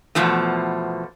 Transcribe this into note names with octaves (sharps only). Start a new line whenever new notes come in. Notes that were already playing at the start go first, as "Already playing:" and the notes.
E2 B2 F3 A3